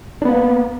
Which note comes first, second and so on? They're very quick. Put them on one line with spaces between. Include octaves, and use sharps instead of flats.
D4 B3 A#3